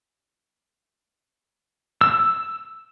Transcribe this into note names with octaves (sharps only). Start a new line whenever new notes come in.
E6